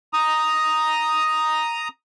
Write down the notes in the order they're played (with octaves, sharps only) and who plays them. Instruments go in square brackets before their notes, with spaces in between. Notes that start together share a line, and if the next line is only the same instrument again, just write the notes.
[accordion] A#5 D#6